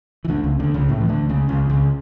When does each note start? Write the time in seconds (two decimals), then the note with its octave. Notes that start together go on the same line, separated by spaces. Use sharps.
0.24 E3
0.29 D2 D3
0.44 C#2 C#3
0.59 D2 D3
0.74 C#2 C#3
0.89 A2 A3
1.01 E3
1.09 D2 D3
1.29 C#2 C#3
1.49 C#2 C#3
1.70 C#2 C#3